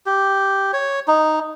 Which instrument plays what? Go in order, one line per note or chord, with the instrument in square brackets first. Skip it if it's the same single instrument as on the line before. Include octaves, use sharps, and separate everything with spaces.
[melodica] G4
C#5
D#4